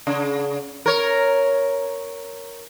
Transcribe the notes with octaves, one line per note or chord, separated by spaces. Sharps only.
C#3
A#4 C#5